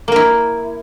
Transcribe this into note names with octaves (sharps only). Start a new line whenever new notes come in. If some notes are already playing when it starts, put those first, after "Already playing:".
A#3 E4 A#4